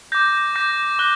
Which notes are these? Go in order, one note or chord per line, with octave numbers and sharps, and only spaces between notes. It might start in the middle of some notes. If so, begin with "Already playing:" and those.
D6 G6 A#6
D6 G6 A#6
D6 F#6 G7